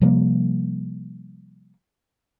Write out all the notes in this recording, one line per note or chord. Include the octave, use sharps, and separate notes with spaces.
C3 F3 G3 A#3